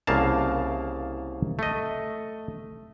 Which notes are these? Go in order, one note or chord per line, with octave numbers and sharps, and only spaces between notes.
C2 C#3 A#3 F5 A5
A3 D#5